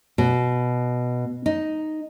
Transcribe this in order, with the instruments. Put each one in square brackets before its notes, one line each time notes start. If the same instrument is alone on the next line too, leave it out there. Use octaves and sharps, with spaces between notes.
[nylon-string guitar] B2
D#4